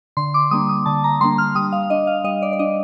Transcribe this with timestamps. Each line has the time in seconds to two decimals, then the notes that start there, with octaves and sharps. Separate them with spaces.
0.17 D3 C6
0.34 D6
0.51 G3 A#3 D4 D#6
0.69 D#6
0.86 D3 A5
1.04 A#5
1.20 G3 A#3 D4 C6
1.38 F6
1.55 G3 D#6
1.72 F5
1.90 D4 D#5
2.07 F5
2.24 G3 D#5
2.42 D5
2.53 D5
2.59 D4 D#5